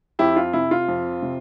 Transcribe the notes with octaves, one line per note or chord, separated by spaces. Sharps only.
F2 E4 G4
F4
C3 E4
F4
F2
C3